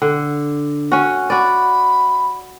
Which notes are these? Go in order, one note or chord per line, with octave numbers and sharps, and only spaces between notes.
D3
C#4 F#4
F#4 D5 B5